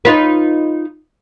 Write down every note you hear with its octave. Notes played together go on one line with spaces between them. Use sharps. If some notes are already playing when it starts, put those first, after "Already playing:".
D#4 F4 B4